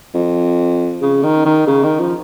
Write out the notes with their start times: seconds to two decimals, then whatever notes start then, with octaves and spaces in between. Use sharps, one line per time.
0.15 F2
1.02 C#3
1.23 D#3
1.46 D#3
1.67 C#3
1.84 D#3
2.00 F3